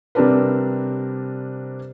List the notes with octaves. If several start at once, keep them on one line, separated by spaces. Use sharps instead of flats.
C3 G3 C4 D4 A#4 B4